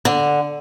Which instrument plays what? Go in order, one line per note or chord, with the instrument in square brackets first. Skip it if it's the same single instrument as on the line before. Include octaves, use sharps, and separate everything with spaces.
[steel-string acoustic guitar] D3